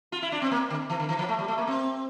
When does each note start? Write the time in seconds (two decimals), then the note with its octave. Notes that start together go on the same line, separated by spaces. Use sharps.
0.12 F4
0.22 E4
0.32 D4
0.42 C4
0.51 A#3
0.70 D3
0.90 E3
0.99 D3
1.09 E3
1.19 F3
1.29 A3
1.39 G3
1.48 A3
1.58 A#3
1.67 C4